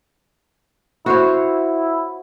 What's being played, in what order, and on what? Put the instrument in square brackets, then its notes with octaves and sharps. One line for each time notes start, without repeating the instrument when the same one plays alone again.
[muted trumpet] E4 [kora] F#4 C5 C#5